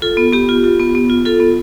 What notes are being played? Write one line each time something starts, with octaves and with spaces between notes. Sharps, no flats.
F4 A4
B3
B3 G4
F4
F4
B3
B3
F4
F4 A4
B3